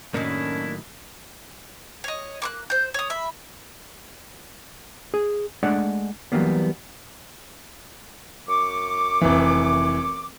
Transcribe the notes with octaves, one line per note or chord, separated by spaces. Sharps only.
F#2 A2 D#3 A#3 C#4 D4 E4
C#5 D#5
A#3 C6 F#6
C5 G6
C#5 D#6
E5 B5
G#4
G#3 A3 D4 D5 F#5
E3 F#3 G3 A#3 B3
F#2 C#6 D6
F1 E3